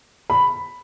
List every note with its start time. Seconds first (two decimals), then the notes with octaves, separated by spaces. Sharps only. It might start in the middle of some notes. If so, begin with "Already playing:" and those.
0.30 B5